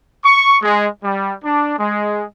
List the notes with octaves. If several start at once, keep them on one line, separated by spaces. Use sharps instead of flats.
C#6
G#3
G3
D4
G#3